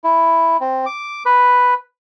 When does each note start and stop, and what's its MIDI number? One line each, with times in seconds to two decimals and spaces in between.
0.04 0.57 64
0.61 0.85 60
0.86 1.23 86
1.26 1.74 71